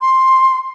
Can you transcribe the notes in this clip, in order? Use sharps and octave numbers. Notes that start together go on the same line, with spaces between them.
C6